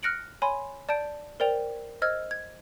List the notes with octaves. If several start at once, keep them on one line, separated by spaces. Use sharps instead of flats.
F6 F#6 A#6 C#7 D7 F#7
C#5 G#5 B5 C6
D5 A5 G6 D7
A#4 C5 D5 G5 F7
C5 D#5 E6 F6 G#6
G#6